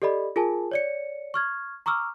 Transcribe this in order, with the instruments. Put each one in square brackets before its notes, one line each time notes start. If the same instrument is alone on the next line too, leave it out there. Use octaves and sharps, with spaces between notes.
[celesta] G4 A4 D5 D#5 B5
F4 G#4 A#4 G#5 A5
C#5 D5 C#7
C#6 F6 G#6
A#5 C#6 D6 E6 F6